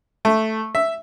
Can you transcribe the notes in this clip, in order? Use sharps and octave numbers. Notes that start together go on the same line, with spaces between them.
A3
E5